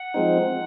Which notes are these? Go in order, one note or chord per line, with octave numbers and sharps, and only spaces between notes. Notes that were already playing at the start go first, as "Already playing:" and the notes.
Already playing: F#5
F3 G#3 C4 D#4